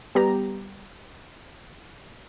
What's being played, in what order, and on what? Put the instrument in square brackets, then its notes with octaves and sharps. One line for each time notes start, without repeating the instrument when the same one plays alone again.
[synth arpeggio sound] G3 B3 G4 A#5